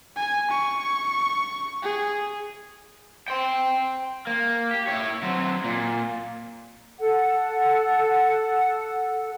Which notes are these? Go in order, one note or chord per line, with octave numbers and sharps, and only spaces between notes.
G#5
C#6
G#4
G5 C6
A#3
G4
E4 C#5
F#3 C4
A#2
A4 F#5